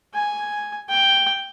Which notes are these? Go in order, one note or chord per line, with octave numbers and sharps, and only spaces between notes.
G#5
G5